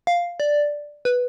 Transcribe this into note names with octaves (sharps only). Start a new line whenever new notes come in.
F5
D5
B4